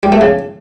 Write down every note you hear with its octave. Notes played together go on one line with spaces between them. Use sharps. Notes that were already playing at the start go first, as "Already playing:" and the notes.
G3
A3
C#3